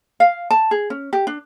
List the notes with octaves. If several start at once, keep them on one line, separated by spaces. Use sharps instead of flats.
F5
A5
G#4
C#4
G4
D4